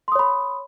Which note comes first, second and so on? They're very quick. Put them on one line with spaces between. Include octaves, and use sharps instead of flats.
C6 D#6 C#5 B5